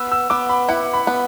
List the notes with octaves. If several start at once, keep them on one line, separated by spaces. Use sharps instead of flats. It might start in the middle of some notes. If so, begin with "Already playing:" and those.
Already playing: B3 E6
E6
B3 D6
B5
E4 F#5
B5
B3